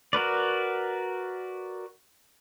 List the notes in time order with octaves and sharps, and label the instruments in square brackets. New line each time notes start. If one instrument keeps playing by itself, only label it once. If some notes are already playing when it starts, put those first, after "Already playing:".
[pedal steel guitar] F#4 A#4 B4 D5